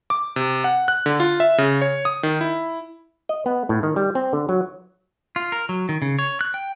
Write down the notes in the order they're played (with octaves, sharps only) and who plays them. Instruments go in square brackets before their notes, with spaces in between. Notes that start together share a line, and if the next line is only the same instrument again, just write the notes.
[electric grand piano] D6
C3
F#5
F#6
D3
F4
E5
C#3
C#5
D#6
D#3
E4
[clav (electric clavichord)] D#5
B3
A2
D#3
G3
C4
D3
F#3
[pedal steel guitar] F4
A#4
F#3
D#3
C#3
C#5
F#6
G5